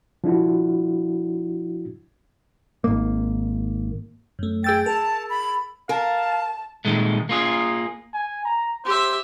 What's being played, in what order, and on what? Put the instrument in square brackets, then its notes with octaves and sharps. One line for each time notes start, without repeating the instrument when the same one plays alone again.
[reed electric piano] F3 D4 E4 F#4
[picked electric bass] G#1 A#3
[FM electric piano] F#2 A3
[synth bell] G#4 E6 A6 [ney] G5
[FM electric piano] A#4 [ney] A5
[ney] B5
[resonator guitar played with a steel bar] A#4 [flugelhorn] F5 [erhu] A5
[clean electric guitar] A#2 D#3 G#3 A3
A#3 F4 G#4
[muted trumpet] G#5
A#5
[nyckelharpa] G4 E5 [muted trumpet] C5